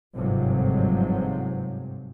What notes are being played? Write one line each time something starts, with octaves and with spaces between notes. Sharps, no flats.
G1 G#2 C3 F3 F#3